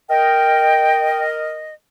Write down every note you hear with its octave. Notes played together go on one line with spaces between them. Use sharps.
A#4 D#5 G5